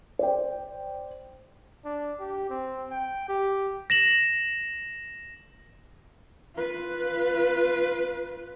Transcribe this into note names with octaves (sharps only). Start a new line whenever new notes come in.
C5 D5 G5
D4
G4
C4
G5
G4
A#6 E7 F#7
F4 B4